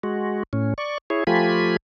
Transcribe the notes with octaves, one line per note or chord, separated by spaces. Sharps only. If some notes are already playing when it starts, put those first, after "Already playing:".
G#3 F#4
A2 C#4
D5 C#6
E4 G#4 C#5
F3 A3 F4 G4 G#5 B5